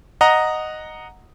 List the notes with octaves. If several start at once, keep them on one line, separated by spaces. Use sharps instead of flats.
D#5 F#5 A#5